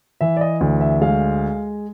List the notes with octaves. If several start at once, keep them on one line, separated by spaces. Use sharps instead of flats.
E3 E5
D5
D#5
D2
E5
G#3 F5